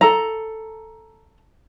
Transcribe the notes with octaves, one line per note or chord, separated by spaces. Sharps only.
A4 A#5